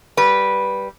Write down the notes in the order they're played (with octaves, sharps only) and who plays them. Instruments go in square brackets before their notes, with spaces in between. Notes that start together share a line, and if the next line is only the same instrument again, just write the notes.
[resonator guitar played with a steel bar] G3 B4